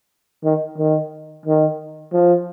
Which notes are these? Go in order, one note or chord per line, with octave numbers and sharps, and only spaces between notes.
D#3
D#3
D#3
F3